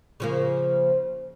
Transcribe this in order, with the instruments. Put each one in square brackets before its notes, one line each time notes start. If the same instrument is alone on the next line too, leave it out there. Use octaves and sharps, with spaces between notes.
[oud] C#3 F3 A#3